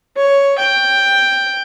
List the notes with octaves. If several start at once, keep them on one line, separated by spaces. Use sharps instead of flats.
C#5
G5